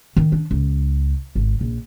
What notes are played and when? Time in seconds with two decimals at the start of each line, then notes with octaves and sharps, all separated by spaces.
0.16 D#3
0.32 D4
0.51 C#2
1.35 G#1
1.61 A#1